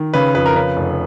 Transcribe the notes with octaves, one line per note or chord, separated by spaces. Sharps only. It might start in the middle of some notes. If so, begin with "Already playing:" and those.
Already playing: D#3
C#3 B4
F2 B4
A#4
C#3 B4
F1